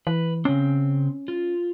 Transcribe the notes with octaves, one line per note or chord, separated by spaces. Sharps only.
E3 B4
C#3 C4 C#4
F4